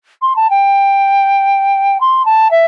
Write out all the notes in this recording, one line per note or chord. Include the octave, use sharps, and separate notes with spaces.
C6
A5
G5
C6
A5
E5